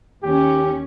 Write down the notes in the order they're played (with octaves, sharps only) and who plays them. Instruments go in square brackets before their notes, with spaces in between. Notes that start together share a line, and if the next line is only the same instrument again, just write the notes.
[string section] D#2 C#4 [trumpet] G4